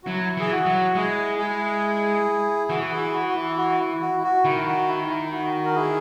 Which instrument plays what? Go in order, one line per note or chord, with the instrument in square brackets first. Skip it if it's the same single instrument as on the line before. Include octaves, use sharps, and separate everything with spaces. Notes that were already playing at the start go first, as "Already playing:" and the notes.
[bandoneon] F#4
[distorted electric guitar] F#3 [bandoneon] E4
[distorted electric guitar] E3 [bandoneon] G#4
[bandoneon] F#4
[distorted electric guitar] F#3
[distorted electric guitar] G#3 [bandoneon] E4 G#4
[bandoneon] E4 G#4
[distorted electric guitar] E3 [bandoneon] F#4
[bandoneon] F#4
E4 G#4
F#4
F#4
E4
F#4
E4
F#4
E4
F#4
[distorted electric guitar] D#3 [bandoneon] E4
[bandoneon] F#4
E4
E4
E4
F#4
A#4
E4 G#4